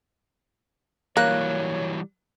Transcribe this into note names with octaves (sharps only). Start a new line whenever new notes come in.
E3 F#3 G3 A#3 C#5 F#6